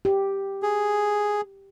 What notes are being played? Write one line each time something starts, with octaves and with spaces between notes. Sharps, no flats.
G4
G#4